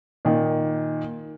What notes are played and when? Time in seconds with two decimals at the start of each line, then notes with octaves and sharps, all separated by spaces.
0.25 A#2 D#3